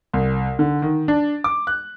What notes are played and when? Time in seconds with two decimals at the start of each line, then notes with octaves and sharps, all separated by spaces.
0.13 C2
0.59 D3
0.82 D#3
1.08 D4
1.44 D6
1.67 F#6